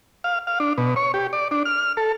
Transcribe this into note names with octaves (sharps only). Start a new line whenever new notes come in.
F5
F5
D4
B2
C#5
G4
D5
D4
F6
A4